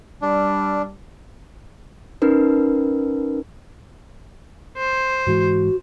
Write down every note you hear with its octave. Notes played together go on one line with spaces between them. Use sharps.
G3 D4
C#4 D#4 A#4 B4
C5
G#2 E3 G#3 F#4